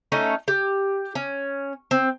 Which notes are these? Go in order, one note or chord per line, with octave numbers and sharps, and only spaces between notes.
A3 C#4 D#4
G4
C#4
C4